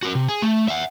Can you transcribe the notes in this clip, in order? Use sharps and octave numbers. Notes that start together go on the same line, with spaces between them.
F#4 A#4
C3
G#4
A3
E5 F#5